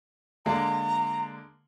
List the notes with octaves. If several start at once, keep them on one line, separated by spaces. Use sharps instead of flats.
D3 G#3 A#3 A#5